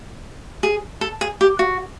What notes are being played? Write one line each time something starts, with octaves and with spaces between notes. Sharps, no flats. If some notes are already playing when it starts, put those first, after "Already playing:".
G#4
A4
G#4
G4
F#4